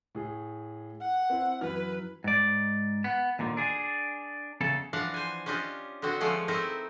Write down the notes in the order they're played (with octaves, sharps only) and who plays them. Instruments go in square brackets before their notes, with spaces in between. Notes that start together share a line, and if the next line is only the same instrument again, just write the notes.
[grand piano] A2 G#4
[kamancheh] F#5
[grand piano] C4 E4
[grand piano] F#2 E3 F6 [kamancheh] B4
[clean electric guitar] G#2 D5
B3
D#2 A#2 D3
D4 G#4
E2 C#3 A4
[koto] E3 F3 D4 F5 F#5
C5 G#5
C#4 D4 F4 G4 D#5
D3 B3 C4 F#4
F3 G#3 A3 C#4 F4 C#5
A3 C4 D#4 E4 A#4 D#5